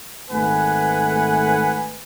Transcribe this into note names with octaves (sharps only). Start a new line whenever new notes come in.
G#1 A3 B4 F#5 G#5